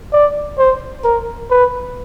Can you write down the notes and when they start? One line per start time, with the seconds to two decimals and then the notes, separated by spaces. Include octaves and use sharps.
0.13 D5
0.59 C5
1.04 A#4
1.50 B4